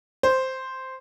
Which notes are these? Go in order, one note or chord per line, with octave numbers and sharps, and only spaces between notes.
C5